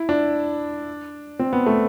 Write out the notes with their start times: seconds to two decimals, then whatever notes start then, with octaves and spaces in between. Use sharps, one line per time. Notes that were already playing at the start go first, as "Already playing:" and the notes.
Already playing: E4
0.09 D4
1.39 C4
1.53 B3
1.66 A3